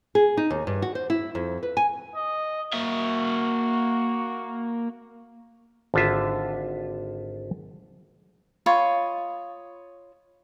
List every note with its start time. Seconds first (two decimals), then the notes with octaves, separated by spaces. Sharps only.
0.15 G#4
0.37 D#4
0.50 D#2
0.67 G2
0.82 F#4
0.95 C5
1.10 E4
1.35 F2
1.63 B4
1.77 G#5
2.16 D#5
2.73 A#3 F#4 E5
5.94 G#1 D3 F4 E5
8.66 F4 C#5 D#5 B5